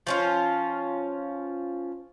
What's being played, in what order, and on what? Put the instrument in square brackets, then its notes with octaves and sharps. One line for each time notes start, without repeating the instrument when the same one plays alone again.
[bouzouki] F3 C#4 F4